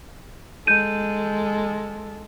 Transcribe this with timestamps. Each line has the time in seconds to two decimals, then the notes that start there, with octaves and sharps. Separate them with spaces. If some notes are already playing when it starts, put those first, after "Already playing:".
0.67 G#3 A4 G6 D#7